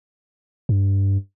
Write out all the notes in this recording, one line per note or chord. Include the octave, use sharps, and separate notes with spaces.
G2